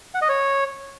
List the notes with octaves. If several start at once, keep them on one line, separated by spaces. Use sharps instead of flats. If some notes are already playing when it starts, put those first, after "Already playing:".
F#5
D#5
C#5